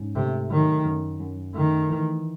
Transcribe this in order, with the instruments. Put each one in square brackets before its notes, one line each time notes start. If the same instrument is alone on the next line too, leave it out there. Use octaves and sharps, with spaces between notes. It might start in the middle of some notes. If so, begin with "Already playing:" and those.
Already playing: [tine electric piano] G#2 C#4
[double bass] C3 [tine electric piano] A3
[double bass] D#3 [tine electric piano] F#3
[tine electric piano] F#2
F#2
[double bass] D#3 [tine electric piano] A3
[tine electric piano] E3